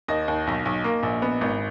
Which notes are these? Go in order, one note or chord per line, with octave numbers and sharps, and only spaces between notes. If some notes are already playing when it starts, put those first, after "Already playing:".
D#2 D#5
D#2
B1
B1
A#3
A#1
B3
G#1